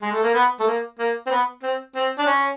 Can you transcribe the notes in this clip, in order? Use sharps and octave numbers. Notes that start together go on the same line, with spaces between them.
G#3
A3
A#3
B3
A3
A#3
A#3
C4
B3
C4
C4
D4
C#4